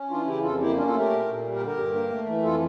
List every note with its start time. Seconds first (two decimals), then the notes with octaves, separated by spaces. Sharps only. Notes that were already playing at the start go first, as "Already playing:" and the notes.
Already playing: C#4
0.10 E3 D4 F4
0.27 C#3 E4 G4
0.43 F2 F4 A4
0.60 A#3 E4 G4
0.76 C#4 D4 F4
0.88 F4 A4
0.93 A3
0.99 G4 A#4
1.10 A#2
1.27 A#2
1.44 G3
1.55 G4 A#4
1.60 D3
1.66 G4 A#4
1.77 G2
1.93 A#3
2.10 A3
2.27 E3
2.43 F2 F4 A4